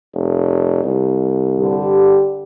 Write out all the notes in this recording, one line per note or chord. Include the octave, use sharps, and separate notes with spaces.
F1
C2
G2 D3 G4